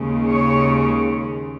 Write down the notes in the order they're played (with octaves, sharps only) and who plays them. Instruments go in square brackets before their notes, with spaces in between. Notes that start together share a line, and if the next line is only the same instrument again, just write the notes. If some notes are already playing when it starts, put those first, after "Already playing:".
Already playing: [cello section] D#2 C#3 G#3
C#5